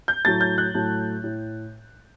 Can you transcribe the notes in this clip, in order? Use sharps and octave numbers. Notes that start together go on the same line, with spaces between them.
G6
A2 F#3 A3 A6
G6
F#6
A2 F#3 A3
A2